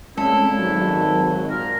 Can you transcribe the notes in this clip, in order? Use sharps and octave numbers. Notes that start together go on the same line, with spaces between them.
A#2 G#3 A3 C4 C#4 E4 A4
G#1 D#3 F#3
A#2 A#4